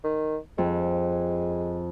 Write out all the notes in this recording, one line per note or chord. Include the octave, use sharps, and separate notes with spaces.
D#3
F2 G#3